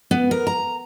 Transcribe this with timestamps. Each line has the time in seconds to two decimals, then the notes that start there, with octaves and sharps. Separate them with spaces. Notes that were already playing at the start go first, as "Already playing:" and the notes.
0.11 B3
0.31 A#4
0.47 A#5